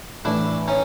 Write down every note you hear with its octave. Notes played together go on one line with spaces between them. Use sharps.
A2 E3 A3 D4 E4
C#4 D#4